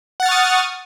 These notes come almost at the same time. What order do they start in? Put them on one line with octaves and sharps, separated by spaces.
F#5 A6 F6 C#6 D#6